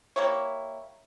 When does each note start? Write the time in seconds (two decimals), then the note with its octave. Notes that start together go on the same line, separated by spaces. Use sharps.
0.16 G3 A#3 E4 C#5